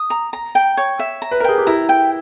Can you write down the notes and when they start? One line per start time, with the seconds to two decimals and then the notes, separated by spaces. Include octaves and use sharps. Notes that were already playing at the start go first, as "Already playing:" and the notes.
Already playing: D#6
0.10 A#5
0.33 A#5
0.55 G5
0.77 C#5
0.99 E5
1.22 A#5
1.31 B4
1.40 A#4
1.44 G#4 G5
1.58 G4
1.67 E4 A#5
1.89 G5